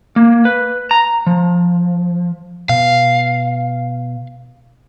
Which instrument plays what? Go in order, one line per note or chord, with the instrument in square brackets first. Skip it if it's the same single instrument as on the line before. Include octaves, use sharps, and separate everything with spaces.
[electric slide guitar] A#3
B4
A#5
F3
[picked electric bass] B2 [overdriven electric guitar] F5